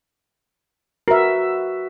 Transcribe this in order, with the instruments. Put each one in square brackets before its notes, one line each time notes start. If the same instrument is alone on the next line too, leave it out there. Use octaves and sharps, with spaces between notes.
[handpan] F#4 B4 E5 [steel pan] A#4